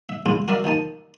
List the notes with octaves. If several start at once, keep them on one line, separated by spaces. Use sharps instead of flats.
E5
C#3 G#3 E4 F4
F#4 A#4 D5 E5 F5
D#3 F3 D#4 A5